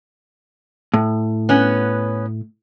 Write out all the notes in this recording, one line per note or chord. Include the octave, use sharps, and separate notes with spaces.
A2
B3 C#4